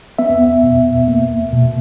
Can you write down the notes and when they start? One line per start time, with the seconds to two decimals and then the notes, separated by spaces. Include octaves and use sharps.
0.19 B3 E5
0.63 B2
1.08 A#3
1.53 B2